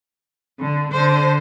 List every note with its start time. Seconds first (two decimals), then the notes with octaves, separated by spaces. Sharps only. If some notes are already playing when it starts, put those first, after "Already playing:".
0.60 D3
0.91 D3 C5